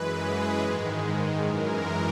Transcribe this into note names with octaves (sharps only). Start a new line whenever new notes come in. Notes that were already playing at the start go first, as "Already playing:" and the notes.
Already playing: F#2 E3 G#3 B4
G#4
G#2 D#3 G#3
F#2 E3 G#3 A#4